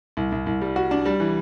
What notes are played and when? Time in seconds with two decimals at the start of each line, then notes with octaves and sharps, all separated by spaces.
0.17 C2
0.32 C2
0.46 C2
0.62 G3
0.76 F#4
0.91 D4
1.06 G3
1.20 E3